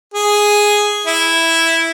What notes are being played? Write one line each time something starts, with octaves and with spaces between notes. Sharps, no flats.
G#4
E4